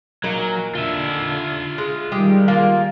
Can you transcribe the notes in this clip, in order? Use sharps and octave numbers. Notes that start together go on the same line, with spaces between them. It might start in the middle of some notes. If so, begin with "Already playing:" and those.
A#2 F#3 D#4 A#4
D3 F4 E5
G#3
D#3 G3 G#3 G4
G#3 A#3 F4